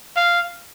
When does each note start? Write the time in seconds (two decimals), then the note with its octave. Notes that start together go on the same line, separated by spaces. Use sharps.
0.16 F5